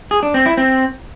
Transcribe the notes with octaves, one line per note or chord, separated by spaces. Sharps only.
G#4
D4
C4
E4
C4